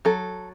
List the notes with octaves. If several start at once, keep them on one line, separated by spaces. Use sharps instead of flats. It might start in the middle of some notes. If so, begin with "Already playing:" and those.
F#3 A4